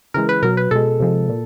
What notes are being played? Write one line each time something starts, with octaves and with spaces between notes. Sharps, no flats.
C#3 E3 G#3 A#4
B4
B2 F#3 A#4
B4
B2 G#3 A4
C3 F3 G#3
A#2